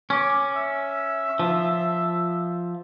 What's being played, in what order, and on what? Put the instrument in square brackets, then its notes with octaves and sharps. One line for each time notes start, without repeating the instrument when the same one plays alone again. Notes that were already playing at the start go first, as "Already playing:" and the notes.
[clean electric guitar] C#4 [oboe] D6
[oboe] E5
[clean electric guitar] F3